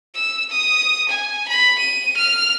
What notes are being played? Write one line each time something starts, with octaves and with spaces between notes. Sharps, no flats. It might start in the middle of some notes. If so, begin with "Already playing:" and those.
E6
D#6
G#5
B5
D#7
F6